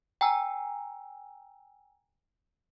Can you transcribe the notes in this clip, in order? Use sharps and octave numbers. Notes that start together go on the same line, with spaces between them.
G5 G#5 A#5 E6